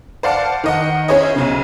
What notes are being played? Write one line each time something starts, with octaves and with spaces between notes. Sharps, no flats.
C5 D5 F5 F#5 A5
D#3 D#5 F#5
C#4 E4 G#4 C5 C#5 D#5
B1 C#3